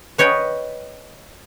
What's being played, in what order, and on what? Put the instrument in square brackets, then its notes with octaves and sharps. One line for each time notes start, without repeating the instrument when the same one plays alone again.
[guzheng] B4 C#5 D#5 G5 B5